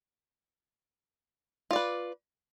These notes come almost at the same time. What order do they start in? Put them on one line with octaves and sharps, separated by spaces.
F4 D5 B4